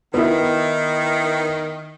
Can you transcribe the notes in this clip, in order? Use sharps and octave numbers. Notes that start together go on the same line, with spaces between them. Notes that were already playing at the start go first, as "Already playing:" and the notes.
D#3 B3 E4